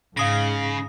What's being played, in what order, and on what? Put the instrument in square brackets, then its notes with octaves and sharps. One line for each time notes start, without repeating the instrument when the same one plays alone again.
[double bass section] G#2 [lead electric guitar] C#3 [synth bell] F5 D#6 A#6